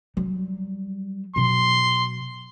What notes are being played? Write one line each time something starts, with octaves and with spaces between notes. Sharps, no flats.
F#3 G3
B2 F#3 C6